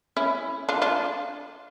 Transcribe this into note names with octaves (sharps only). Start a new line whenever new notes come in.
C#4 E4
D4 F4
D4 F4